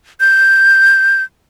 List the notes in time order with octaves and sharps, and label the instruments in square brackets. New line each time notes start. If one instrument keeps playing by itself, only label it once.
[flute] G6